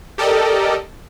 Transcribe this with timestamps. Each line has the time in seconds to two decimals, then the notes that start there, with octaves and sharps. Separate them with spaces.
0.18 G4 A4 A#4 D5 D#5